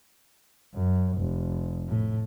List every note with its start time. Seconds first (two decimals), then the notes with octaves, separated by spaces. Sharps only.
0.74 F#2
1.18 F1
1.88 A2